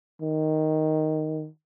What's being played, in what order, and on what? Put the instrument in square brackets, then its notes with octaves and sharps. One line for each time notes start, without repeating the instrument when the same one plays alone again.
[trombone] D#3